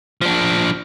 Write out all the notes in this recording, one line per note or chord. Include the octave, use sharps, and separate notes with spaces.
F3 D4